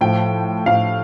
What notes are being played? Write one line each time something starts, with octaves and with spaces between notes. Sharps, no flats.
A2 F3 G5
A2 F3 F5